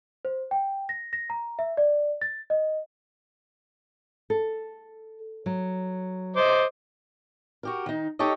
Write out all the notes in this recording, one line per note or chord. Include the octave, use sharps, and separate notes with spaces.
C5
G5
A#6
A#6
A#5
E5
D5
A6
D#5
A4
F#3
C5 D#5 D6
F#4 G4 A#4
D#3 D#4
D#4 G4 A4 C#5 D#5